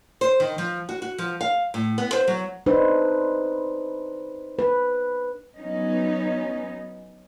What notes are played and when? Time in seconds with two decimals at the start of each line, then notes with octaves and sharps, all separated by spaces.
0.21 C5
0.40 D#3
0.58 F3
0.89 F#4
1.02 F#4
1.18 F3
1.41 F5
1.74 A2
1.98 B3
2.13 C5
2.27 F#3
2.66 D4 D#4 B4 C5
4.59 B4
5.58 F#3 B3 C#4 D#4